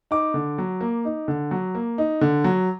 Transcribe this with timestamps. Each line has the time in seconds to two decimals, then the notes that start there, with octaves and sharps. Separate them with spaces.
0.11 D#4 D6
0.34 D3
0.58 F#3
0.81 A#3
1.05 D#4
1.28 D3
1.51 F#3
1.75 A#3
1.98 D#4
2.21 D3
2.44 F#3